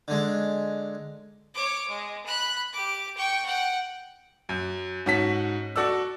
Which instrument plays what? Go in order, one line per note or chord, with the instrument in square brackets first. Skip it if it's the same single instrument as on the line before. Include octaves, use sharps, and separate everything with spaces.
[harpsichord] D3 G#3
[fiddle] C#5 D6
G#3
B5 F#6
G4 D6
G5 C#6
F#5 G5
[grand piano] F#2
G#2 C#4 F#4 A5 B6
F#4 A4 D5 E6